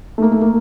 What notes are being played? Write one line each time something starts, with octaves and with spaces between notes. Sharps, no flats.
A3
A#3
A3
A#3